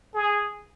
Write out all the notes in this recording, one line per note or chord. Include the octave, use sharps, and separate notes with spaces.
G#4